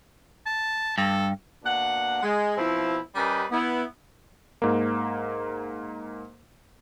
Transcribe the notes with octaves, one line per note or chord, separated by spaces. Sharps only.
A5
G2 A4
B2 A#3 D4 F#5
G#3
B2 F3 C4 E4
G3 C#4 G4 A#4 B4 D#5
B3 E4
G#2 A#3